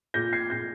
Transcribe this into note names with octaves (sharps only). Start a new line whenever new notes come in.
A#2 G6 A#6
G#6 C7
A#2 G6 A#6